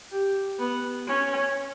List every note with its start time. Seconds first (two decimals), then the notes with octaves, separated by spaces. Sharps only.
0.11 G4
0.59 B3
1.07 C#4